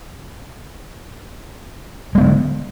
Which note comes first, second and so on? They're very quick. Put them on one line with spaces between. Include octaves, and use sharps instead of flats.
G#3 B3 D3